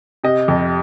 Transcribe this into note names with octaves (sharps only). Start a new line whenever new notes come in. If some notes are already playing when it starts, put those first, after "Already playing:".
C3 D#5
F2